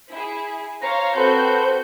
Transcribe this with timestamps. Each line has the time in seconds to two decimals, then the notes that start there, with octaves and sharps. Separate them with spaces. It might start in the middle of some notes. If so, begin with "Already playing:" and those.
0.10 E4 G#4
0.82 C5 C#5 F5 A#5
1.16 C4 F#4 A4 B4 C5 G6